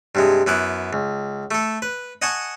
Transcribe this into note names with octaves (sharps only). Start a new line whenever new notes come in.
G2 C3 G#3
F#2 B3 E4 D6
C#2
A3 A4
B4
D#5 F#5 G#5 A5 C#6 D#6